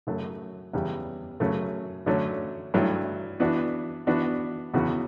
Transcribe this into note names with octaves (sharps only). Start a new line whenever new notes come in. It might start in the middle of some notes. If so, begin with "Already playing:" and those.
F#2 C#3 F#3 A3
E2 C#3 G3
F#2 C#3 F#3 A3 C#4
D3 F#3 A3 C#4
G2 F#3 A3 E4
E3 B3 D4 F#4
E3 B3 D4 F#4
E2 C#3 E3 B3 F#4